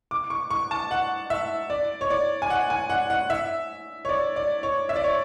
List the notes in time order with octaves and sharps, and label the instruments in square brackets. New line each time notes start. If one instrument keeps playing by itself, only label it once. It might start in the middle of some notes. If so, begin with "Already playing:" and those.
[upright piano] D6
C#6
C#6
A5
F#5
E5
D5
C#5
D5
G#5
F#5
G#5
F#5
F#5
E5
C#5
D5
D5
C#5
E5
D5
C#5